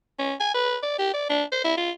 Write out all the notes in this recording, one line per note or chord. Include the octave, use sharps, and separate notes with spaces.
C#4
G#5
B4
D5
G4
D5
D4
C5
E4
F4